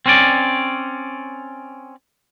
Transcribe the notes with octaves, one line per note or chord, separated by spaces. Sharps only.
C4 C#4 D5